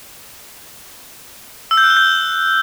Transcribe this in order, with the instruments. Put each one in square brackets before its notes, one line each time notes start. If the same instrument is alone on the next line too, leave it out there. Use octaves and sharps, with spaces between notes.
[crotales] E6
G6
F#6
G7
G6